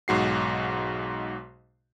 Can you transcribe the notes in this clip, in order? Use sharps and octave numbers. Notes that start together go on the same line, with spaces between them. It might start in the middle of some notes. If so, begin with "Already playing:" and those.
B1 G#2 F#4 C7